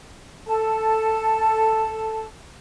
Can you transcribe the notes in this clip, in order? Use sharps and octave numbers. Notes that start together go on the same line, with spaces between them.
A4 A5